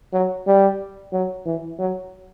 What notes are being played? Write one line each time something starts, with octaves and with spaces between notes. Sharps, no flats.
F#3
G3
F#3
E3
F#3